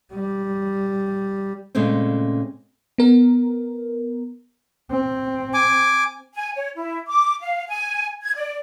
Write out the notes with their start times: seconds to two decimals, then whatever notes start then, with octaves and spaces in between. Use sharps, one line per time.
0.14 G3
1.75 A#2 C#3 G#3 A3 C4 C#4
2.98 B3 A#4
4.91 C4
5.54 G#5 D6
6.35 G#5
6.55 C#5
6.76 E4
7.07 D6
7.41 F5
7.68 G#5
8.22 G#6
8.35 D5